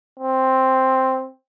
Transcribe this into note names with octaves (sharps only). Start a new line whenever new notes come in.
C4